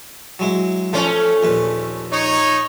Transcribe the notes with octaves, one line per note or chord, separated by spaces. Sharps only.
F#3 G#3 E4
F3 A3 C#4 F4
A#1 D#2 B4
D#4 C#5